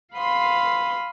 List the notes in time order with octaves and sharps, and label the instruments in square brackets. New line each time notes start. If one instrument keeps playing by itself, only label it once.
[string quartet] F5 B5 C6 D#6